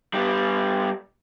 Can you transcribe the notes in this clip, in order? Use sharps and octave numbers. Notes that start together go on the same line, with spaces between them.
G3 B3